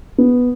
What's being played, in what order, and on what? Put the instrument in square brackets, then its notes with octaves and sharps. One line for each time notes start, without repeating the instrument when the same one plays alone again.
[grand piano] B3